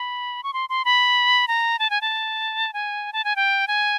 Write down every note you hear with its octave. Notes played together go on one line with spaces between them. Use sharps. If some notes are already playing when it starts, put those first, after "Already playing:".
Already playing: B5
C#6
C6
C6
B5
A#5
A5
G#5
A5
G#5
A5
G#5
G5
G#5